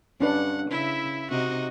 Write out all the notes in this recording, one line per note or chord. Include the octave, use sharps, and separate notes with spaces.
G2 C#4 D4 B4 F#5
C#3 E4 E5
C3 D#4 F#4 D#5